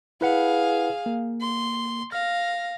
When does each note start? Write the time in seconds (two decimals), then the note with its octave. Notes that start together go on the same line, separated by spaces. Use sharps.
0.21 E4 G#4 B4 F5 F#5
1.06 A#3
1.41 C6
2.12 F5 F6 A#6